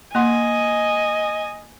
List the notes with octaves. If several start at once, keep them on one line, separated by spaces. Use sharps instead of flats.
A#3 D#5 F#5 G#5 C6